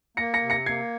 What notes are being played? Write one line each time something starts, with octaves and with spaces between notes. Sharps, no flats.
A#3 A#6 C#7
A#6 C#7
C3
A#6 C#7
A#3 G#6 C7